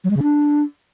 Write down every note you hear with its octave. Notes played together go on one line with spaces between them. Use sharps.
F#3
G#3
C#3
D4